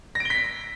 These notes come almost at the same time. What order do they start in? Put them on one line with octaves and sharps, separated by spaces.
A#6 D7 G7 B6